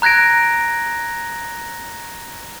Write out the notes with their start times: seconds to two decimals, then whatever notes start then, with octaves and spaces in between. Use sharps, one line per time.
0.02 A#5 F#6 G#6 A#6 D7